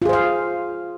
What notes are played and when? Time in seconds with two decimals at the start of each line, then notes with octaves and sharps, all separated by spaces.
0.02 F4
0.05 G#4
0.09 C5
0.13 F5